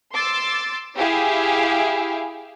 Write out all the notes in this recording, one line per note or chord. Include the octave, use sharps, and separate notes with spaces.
C6 D6 E6 A6
E4 G4 G#4 E5 F5